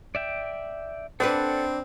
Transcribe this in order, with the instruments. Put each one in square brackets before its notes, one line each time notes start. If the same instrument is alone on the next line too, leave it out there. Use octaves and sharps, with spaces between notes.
[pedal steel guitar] D5 E5 G5
[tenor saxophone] C4 [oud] D4 B4 [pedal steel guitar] A4 F#5